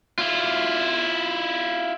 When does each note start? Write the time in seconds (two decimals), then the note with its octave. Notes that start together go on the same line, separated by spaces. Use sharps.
0.18 E4 F4